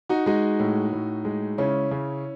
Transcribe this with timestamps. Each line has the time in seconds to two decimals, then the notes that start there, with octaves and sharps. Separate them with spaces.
0.09 D#4 F#4
0.26 G#3 D#4 F#4
0.60 A2
0.93 A2
1.25 G#3
1.58 C#3 C#4 E4
1.91 C#3